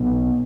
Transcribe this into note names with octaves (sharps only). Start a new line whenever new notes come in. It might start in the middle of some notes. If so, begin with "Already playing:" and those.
Already playing: B1 B2